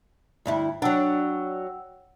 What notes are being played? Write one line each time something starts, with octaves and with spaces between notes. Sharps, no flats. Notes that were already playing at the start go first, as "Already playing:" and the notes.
D2 G2 E4
F#3 D4 F#5 G5 E6